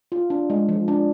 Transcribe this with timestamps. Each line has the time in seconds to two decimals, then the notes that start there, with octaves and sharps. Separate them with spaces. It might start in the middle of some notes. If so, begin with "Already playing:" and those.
0.12 F4
0.30 D4
0.50 G#3
0.69 F3
0.88 D4